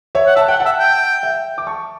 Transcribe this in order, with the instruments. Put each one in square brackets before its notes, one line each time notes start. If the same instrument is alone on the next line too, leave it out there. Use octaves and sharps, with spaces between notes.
[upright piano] C#5 E5
[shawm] F#5
[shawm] E5 [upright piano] A5
[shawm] F#5 [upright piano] G5
[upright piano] F#5 A5
[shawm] E5
G5
[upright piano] E5 G5
D6
A5 C#6